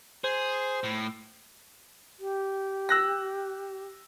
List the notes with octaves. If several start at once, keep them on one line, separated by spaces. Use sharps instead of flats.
G#4 C5
A2
G4
E6 F#6 A#6